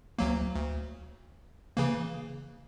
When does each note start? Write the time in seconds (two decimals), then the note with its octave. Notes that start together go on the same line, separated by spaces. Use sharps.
0.19 D2 F#3 A#3
0.55 D2
1.77 C#3 E3 A#3